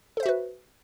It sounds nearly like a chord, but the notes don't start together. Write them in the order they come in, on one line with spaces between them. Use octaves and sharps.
A4 C5 E5 F#4 B4